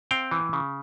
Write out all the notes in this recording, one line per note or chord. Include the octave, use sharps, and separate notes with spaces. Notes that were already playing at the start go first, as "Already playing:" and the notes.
C4 F5 G5
E3
C#3